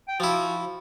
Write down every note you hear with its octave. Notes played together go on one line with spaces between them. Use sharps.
G5
F3 E4 F#4